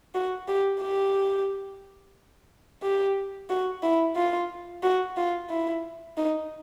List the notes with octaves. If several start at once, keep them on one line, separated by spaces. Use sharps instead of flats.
F#4
G4
G4
G4
F#4
E4
F4
F#4
F4
E4
D#4